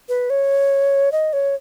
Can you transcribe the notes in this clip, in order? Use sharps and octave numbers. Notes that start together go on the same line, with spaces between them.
B4
C#5
D#5
C#5